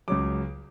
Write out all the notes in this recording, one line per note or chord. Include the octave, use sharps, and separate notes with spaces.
C#2 C#3 F#3 D6